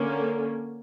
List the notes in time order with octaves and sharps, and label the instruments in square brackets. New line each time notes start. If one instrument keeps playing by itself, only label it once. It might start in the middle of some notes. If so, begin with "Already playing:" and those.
Already playing: [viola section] D3 A#3 C#4